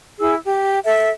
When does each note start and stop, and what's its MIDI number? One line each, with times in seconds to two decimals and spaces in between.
0.19 0.35 64
0.19 0.35 68
0.19 0.35 88
0.45 0.79 67
0.85 1.10 69
0.85 1.10 76